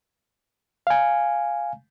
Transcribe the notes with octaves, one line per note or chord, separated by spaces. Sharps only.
F5 G#5